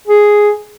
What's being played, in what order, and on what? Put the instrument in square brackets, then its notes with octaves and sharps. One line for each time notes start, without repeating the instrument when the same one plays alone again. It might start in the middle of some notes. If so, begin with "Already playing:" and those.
[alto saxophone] G#4